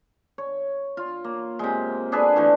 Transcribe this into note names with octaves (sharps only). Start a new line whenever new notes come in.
C#5
F4
A#3
C3 G#3
D4 G#4 A4 B4
D3 E3 A3